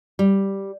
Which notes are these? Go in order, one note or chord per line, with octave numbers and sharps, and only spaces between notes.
G3